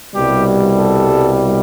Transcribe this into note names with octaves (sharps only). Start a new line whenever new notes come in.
C2 B2 G3 G4
A4